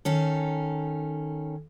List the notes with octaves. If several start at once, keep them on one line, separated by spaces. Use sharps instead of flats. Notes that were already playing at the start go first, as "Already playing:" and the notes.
D#3 C#4 A4